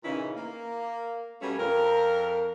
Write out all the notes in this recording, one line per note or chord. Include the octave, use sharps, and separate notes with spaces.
A#2 C#3 E3 C#4 D#4 E4
A#3
B2 G3 A3 A#3 C#4
F2 A#4